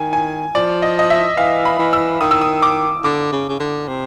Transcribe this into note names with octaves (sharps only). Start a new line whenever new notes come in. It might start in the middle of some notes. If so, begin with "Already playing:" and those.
Already playing: D#3 G#5
G#5
F3 D5
D#5
D#5
E5
E3 F5
B5
E3
E6
D#3 D#6
E6
D#6
D6
D3 D6
C#3
C#3
D3
C3